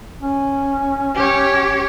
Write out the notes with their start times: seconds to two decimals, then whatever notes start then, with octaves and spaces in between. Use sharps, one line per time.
0.22 C#4
1.15 G4 C#5